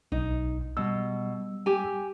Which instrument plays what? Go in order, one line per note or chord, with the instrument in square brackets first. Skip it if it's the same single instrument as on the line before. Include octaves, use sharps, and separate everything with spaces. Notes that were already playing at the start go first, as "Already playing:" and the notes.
[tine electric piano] B1 [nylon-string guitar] D#4
[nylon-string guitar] B2 [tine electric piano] G3 E6
[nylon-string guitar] G4 G#5